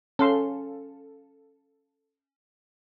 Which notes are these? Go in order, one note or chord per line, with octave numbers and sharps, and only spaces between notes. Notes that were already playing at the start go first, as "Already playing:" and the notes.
C#4 A4 F5 C6